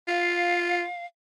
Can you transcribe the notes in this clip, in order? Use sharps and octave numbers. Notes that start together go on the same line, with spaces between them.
F4 F5